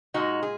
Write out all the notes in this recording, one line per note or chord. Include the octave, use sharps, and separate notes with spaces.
A#2 G#3 D#4 F#4
G#4